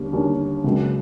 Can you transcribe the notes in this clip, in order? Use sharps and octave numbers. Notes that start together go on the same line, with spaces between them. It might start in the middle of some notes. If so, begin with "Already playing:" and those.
Already playing: D#2 D3 G3 A#3 C#4
D#2 D3 G3 A#3 C#4
C#2 C#3 F#3 A#3